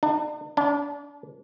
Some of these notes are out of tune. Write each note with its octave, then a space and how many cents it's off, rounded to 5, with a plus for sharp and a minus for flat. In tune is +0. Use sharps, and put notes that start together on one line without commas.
D4 +45
D4 -30